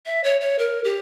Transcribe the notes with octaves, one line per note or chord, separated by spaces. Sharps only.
E5
C#5
C#5
A#4
G4